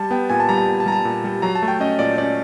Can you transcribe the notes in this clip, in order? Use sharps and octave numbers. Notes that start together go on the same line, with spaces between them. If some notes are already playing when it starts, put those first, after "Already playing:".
Already playing: G3 A5
B3 G5
A#2 G#5
A5
G3 A#5
A5
A#2
A5
G3 A#5
A5
A#2
G3
F#3 A#5
A5
A3
G5
C#4 D#5
A#2 D5
C#4 D5